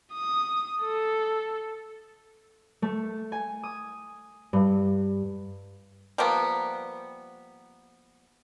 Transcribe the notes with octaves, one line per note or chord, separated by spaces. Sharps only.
D#6
A4
A3
G#5
D#6
G2
F3 G3 A#3 B3